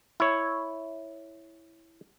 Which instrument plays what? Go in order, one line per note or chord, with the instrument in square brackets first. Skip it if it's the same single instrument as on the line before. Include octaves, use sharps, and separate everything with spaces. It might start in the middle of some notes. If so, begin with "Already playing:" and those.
[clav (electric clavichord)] E4 C#5